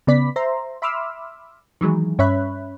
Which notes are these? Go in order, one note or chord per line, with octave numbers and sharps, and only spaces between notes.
C#3 B3 D5 B5 B6
C5 E5 A#5 C6
E5 B5 C6 D6 E6 F6
D#3 E3 F#3 G#3
G2 C#4 C#5 E5 B5 F#6